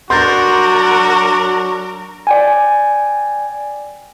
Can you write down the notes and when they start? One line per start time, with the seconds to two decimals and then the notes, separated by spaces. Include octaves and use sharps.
0.10 F#3 D4 F#4 A#4 C6 G6 A6
2.27 D5 G5 G#5